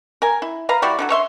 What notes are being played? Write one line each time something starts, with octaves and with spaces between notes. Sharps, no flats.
A#4 G#5
E4
B4 F5 A#5
G3 E4 F#4 D5
D3 F3 F#3
C#5 E5 C6